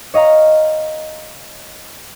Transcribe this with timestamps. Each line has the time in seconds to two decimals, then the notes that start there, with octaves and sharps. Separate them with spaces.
0.14 C#5 D#5 F5 A#5